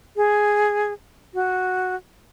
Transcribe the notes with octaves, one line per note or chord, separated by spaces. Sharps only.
G#4
F#4